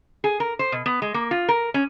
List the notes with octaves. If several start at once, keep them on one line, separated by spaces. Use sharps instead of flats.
G#4
A#4
C5
B2
B3
G#3
A#3
F4
A#4
C#4